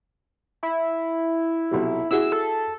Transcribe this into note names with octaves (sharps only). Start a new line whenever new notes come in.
E4
B1 C3 F#3
E4 F#4 G#4 E6
A4